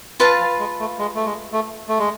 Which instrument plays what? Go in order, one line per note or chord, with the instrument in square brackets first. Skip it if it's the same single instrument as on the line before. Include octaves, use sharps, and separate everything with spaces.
[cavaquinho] F4 B4 F5 A5
[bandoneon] F3
G#3
A3
G#3
A3
G#3
A3
A3
G#3